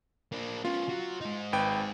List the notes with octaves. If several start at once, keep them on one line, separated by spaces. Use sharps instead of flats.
A#3 D4
B3 C#4 F4
F#3
G#3 D#4
G#1 B4 G5